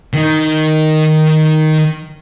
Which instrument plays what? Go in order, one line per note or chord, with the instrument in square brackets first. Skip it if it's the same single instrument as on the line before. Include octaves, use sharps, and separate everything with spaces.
[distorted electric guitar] D#3 D#4